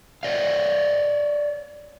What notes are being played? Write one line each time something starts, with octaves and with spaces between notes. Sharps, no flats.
C#5 D5 F5